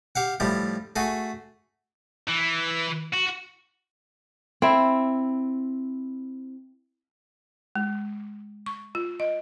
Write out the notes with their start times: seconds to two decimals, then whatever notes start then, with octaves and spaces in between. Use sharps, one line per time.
0.15 G4 F5 F#5
0.40 A2 F3 G3 E4
0.96 A3 F#4 G#4
2.28 E3
3.14 F#4
4.62 C4 E4
7.75 G#3
8.66 C#6
8.95 F4
9.20 D#5